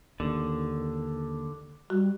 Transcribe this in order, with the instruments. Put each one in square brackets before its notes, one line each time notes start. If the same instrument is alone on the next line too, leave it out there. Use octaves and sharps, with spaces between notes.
[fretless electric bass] D#2 [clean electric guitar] D3
[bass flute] G3 [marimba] F#4